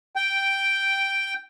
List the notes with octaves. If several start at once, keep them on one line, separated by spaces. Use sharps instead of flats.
G5